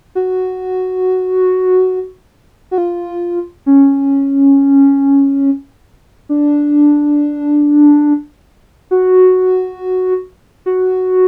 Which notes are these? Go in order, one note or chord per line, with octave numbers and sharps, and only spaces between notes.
F#4
F#4
F4
C#4
D4
F#4
F#4